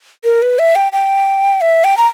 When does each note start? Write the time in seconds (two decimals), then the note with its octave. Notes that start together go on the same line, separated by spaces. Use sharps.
0.24 A#4
0.42 B4
0.59 E5
0.75 G5
0.92 G5
1.61 E5
1.84 G5
1.97 A#5